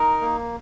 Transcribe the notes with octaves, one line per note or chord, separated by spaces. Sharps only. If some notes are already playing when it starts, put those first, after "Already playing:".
Already playing: D#4 A#4
A#3